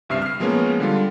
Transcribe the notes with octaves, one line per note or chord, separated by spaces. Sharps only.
C#2 G2 C3 E5 F6 C7
F6 C7
F3 G#3 A#3 B3 C#4
D3 G3 F4